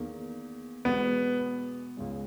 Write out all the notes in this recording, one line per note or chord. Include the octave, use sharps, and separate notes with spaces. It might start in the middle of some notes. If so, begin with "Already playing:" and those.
Already playing: E2 D#3 A#3 G#4
E2 B2 G#3 B3
C#2 C#3 G#3